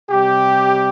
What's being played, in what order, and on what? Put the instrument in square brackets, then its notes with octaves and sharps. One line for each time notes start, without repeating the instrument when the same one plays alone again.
[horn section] C3 G3 G4